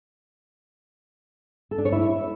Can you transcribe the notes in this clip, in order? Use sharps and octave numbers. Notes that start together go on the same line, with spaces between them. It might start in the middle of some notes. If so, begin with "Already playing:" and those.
A4
D4
C#5
E4